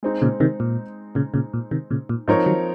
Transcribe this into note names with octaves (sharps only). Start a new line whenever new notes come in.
G#3 C4 D#4
A#2 C#3
C3 D#3
A#2
A#2 C#3
A#2 C#3
A#2
C3 D#3
A#2 C#3
A#2
G#2 F3 C4 D#4 A#4 C#5
D#3 F#3